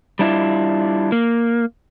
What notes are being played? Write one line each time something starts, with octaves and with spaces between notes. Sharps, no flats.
G3 D4 E4 F4
A#3